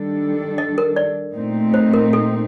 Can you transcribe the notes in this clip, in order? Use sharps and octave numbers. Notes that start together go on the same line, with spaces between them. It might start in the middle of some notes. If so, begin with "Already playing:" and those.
Already playing: D#3 G3 D4 A4
D#5
A#4
D5
A#2 A3 C4 D#4
C5
A#4
A4